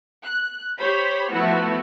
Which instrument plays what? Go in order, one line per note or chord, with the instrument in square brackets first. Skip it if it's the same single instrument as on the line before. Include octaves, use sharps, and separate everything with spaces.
[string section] F#6
G4 C5 C#5 B5
F3 A3 B3 E4 F#4